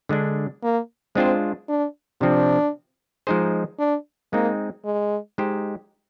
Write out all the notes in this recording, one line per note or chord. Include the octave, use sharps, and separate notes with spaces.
D3 G#3 D4
A#3
G#3 C4 D4 F4 C5
D4
C3 F3 C4 D4
F3 G#3 D#4 G#4 C5
D4
G#3 A#3 C4 D#4
G#3
G#3 D#4 G4 C5